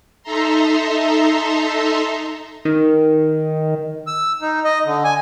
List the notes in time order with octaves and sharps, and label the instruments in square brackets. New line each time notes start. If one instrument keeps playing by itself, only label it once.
[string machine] D#4 A4 E5 A#5 C6
[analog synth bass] D#3
[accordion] E6
D#4
D#5
D3
G#5